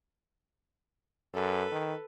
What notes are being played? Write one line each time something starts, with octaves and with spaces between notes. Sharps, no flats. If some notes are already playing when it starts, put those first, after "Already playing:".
F#2 A4 B4
D#3